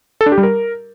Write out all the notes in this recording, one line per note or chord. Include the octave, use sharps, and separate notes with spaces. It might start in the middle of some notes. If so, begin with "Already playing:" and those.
A4
D4
G4
G3
A#4